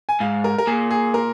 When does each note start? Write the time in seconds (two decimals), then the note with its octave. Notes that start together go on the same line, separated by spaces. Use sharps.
0.09 G#5
0.20 G#2 F5
0.44 A#4
0.58 A#4
0.67 A#2 G#4
0.91 G#4
1.14 A#4